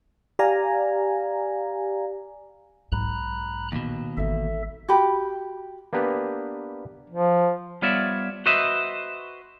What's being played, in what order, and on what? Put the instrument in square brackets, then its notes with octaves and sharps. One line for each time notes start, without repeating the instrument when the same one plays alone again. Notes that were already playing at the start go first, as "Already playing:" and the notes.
[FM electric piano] G4 D5 F5 G#5 A#5
[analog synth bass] B1 [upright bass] G#2 [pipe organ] A#5 B5 F#6
[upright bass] A#1 [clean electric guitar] D#2 B2
[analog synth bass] G#1 [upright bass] E3 D#4 [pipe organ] A4 E5
[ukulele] F#4 G4 B5
[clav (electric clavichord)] A#3 B3 D4 G4 B4
[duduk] F3
[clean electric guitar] G3 B3 F4 C#5 D5 E5
F#4 B4 C5 D#5 E5